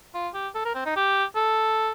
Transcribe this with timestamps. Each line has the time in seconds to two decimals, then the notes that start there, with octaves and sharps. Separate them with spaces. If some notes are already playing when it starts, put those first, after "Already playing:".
0.14 F4
0.34 G4
0.55 A4
0.65 A#4
0.74 C4
0.86 D#4
0.96 G4
1.35 A4